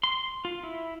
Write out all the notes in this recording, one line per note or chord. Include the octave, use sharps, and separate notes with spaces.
C6
F4
E4